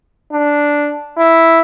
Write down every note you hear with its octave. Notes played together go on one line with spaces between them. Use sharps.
D4
E4